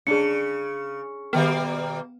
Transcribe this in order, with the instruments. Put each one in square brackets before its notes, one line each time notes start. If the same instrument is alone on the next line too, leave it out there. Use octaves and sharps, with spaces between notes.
[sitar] C#3 [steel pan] C#4 D4 [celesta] G#4 C#7
[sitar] B2 G3 A#3 [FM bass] D#3 [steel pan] B3 F5